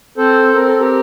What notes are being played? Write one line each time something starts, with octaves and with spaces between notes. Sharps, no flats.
C4 A4 C5
C4 A#4
A4
G4 A#4